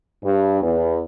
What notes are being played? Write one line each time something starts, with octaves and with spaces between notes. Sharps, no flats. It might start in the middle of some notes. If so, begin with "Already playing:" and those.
G2
E2